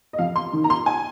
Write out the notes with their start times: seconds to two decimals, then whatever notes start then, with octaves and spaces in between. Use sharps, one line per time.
0.13 D#5
0.18 F2 F5
0.36 C6
0.53 D#3
0.64 A#5
0.70 C6
0.86 G#5